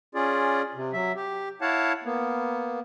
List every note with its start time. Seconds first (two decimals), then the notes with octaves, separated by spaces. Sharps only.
0.15 C#4 F4 G#4 D5
0.74 C3
0.93 F#3 E5
1.16 G4
1.62 E4 C#5 F5 F#5 A5
2.04 A#3 B3